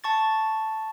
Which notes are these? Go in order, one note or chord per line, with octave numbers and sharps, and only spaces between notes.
A5 C#6 A6